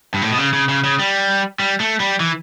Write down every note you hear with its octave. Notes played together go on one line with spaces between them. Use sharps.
G2
A2
B2
C#3
C#3
C#3
C#3
G3
G3
A3
G3
E3